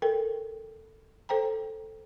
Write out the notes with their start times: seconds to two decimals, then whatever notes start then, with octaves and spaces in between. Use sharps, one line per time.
0.02 A4 A#4 G5
1.29 A4 C5 G5 A#5